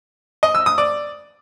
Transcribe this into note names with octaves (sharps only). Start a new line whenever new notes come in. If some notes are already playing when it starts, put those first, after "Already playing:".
D#5
E6
D#6
D5